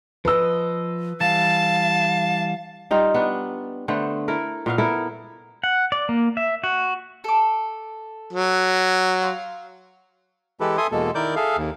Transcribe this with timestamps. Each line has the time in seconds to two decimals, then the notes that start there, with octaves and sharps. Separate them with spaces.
0.25 F3 B4 D#5 E6
1.21 E3 G3 F5 A5
2.91 G3 D#4 F4
3.14 B3 D4
3.88 D3 A3 B3 C5
4.28 E4 A4 A#4
4.66 A#2 B3 F5
4.78 B3 E4 A4 A#4
5.64 F#5
5.92 D5
6.09 A#3
6.37 E5
6.64 F#4
7.24 A4 D6
8.32 F#3
9.22 F5 C6
10.60 E3 G#3 E4 G4 A4 B4
10.77 A4 E5 G#5 C6 D#6
10.92 E2 B2 G#3 A#3 A4
11.15 D#3 E4 A#4 D5 D6 G6
11.36 G#4 A4 E5 F5
11.57 D#2